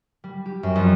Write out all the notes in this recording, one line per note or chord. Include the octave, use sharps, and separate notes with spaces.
G3
G4
F#2
F2